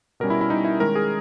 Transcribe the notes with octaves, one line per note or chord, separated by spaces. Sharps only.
B2 G3 C#4 A#4
E4
E4
B2 G3 C#4 D#4
E4
D#3 G#3 C#4 A#4
G#4